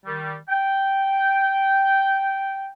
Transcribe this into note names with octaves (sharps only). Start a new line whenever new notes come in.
D#3 G3
G5